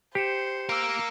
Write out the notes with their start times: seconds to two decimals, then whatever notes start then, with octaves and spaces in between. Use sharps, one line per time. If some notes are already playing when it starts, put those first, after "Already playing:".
0.15 G4 C5 C7 C#7 E7
0.69 A#4 F5 E6 D7